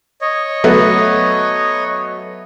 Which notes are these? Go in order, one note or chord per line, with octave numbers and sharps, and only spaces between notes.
C#5 D#5
F#3 A3 B3